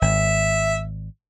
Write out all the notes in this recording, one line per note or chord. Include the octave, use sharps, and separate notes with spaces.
G#1 E5